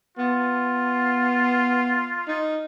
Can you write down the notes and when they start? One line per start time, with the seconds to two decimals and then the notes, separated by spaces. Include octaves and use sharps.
0.18 B3 F4
2.28 D#4